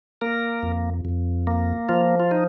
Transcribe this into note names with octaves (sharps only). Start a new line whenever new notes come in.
A#3 A#4
F2
F2
A#3
F3 F4
F4
D#4